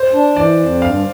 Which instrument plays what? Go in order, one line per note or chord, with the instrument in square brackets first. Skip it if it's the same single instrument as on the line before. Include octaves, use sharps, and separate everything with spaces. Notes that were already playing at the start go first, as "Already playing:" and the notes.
Already playing: [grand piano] C5
[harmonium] D4
[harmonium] E3 [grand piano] D5
[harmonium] F2
[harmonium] G2 [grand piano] F5